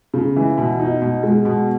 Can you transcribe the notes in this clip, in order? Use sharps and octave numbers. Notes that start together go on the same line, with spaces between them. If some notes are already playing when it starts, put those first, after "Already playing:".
C#3
E3
B2
D#4
B2
G#3
B2